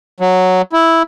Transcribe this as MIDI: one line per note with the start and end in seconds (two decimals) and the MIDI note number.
0.20 0.62 54
0.73 1.03 64